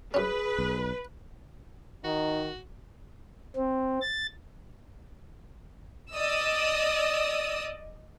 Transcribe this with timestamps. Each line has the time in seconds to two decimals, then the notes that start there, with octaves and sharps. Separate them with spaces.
0.14 F#2 C#4 G#4 B4
0.58 B1
2.04 D#3 D#4 F#4
3.56 C4
4.02 A6
6.12 D5 D#5 D#6 E6